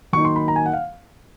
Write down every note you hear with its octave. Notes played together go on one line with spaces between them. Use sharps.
D#3 F#3 A#3 D#4 C#6
C6
B5
A#5
G#5
F#5
F5